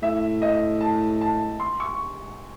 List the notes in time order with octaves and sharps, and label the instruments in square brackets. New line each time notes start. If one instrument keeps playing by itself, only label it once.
[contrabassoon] A2 [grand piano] E5
[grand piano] D#5
A5
A5
C6
C#6